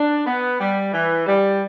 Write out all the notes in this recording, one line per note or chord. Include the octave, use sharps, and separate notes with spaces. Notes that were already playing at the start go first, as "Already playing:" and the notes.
Already playing: D4
B3
G3
E3
G3